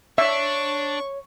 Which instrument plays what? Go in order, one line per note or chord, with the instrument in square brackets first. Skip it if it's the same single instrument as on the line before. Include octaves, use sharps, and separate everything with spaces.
[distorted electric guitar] D4 [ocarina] C#5 [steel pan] E5 [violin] C#6